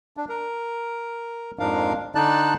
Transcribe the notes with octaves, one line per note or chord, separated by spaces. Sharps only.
D4
A#4
F2 G#2 F3 D4 A#4 F5
D3 D4 D#4 D5 A5 F#6